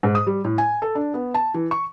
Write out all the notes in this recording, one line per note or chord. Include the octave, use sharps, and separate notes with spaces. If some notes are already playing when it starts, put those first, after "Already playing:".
G#2
D#6
G3
A2
G#5
A4
D4
B3
A5
E3
C#6